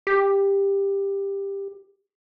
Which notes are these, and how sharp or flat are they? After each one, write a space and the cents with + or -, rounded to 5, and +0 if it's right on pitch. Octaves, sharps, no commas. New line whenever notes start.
G4 +15